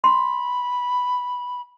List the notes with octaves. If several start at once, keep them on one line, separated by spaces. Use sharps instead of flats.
B5 C6